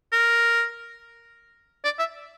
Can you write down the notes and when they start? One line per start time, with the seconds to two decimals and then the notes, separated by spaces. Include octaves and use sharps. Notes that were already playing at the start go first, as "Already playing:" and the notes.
0.12 A#4
1.84 D5
1.99 E5